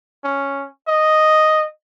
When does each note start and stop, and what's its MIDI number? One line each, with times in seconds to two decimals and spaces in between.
0.24 0.66 61
0.88 1.66 75